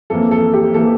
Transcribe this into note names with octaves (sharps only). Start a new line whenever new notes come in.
F2 E3 A#3 A4
A4
G4
E3 A#3 A4